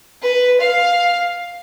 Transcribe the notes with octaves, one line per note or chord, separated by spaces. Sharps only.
B4
F5